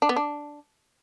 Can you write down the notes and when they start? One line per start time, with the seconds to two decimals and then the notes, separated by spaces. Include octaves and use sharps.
0.02 D4
0.09 B3
0.16 D4